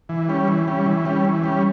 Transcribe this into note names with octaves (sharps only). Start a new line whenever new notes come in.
E3
G3 C#4
E3
G3 C#4
E3
G3 C#4
E3
G3 C#4